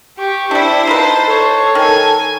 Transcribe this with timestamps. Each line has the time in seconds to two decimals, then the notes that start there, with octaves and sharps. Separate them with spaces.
0.18 G4 C#6
0.51 G3 D4 E4 C5
0.87 D#4 F4 B4 A5
1.28 A4 C#5
1.75 D#3 G#5